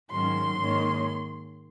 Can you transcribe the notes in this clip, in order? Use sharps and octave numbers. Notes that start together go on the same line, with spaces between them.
G#2 D#3 F#3 C#4 C6
G#2 D#3 A#3 C#4